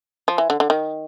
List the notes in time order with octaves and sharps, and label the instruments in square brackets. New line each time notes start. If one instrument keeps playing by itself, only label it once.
[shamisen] F3
E3
D3
D3
D#3